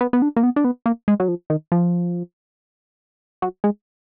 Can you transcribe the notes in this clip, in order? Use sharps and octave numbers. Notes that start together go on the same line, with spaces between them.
B3
B3
D4
A#3
B3
D4
B3
A#3
G#3
F#3
F3
D#3
F3
F#3
G#3